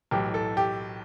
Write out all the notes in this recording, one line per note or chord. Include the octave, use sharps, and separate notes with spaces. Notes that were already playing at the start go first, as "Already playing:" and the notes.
B1 A2 E3 G4
A4
G4